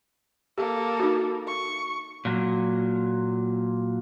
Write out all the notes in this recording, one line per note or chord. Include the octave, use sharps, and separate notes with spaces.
A#3 G4 A4
D#4 F#4
C#6
A#2 F#3